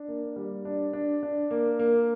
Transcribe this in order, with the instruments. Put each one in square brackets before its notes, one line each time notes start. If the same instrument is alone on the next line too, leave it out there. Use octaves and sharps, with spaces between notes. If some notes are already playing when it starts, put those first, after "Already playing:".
Already playing: [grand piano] D4
A#3
G3
D4
D4
D4
A#3
A#3